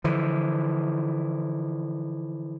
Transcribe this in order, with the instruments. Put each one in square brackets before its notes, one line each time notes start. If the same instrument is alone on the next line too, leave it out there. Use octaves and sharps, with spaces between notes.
[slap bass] D3 E3 F3